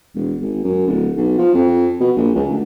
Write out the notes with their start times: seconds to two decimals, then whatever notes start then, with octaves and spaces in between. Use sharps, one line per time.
0.15 E1
0.40 G#1
0.63 F#2
0.87 D1
1.17 B1
1.38 F3
1.55 F2
2.00 B2
2.16 A#1
2.34 C#2
2.51 D2